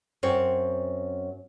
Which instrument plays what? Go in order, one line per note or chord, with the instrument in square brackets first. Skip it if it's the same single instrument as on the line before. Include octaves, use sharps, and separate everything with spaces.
[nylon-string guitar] F#2 C4 C#5